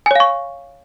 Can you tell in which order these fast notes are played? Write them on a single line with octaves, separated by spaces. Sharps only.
G#5 C#5 F5 C#6